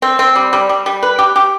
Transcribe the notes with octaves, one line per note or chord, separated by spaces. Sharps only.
C4
C4
G3
G3
G3
G3
B4
G4
G4